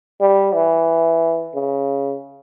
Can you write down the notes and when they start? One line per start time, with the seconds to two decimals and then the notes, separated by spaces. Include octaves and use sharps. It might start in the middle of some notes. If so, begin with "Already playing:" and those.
0.20 G3
0.53 E3
1.54 C#3